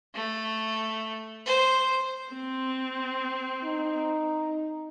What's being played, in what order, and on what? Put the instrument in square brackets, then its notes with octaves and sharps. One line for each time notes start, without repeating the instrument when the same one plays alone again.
[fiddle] A3
C5
[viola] C4
[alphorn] D#4